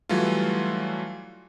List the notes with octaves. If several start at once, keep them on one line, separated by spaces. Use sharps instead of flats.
E3 F#3 G3 A3 F4